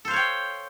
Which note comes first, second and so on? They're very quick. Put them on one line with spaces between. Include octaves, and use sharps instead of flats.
A4 C5 F5 C#5 G5